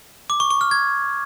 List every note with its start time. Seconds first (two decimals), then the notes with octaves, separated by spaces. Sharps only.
0.30 D6
0.40 C#6
0.50 C#6
0.61 F6
0.71 G#6